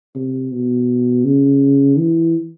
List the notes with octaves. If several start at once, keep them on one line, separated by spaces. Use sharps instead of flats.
C3
B2
C#3
E3